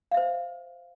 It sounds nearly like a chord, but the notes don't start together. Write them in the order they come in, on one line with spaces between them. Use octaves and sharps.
F5 E5 C5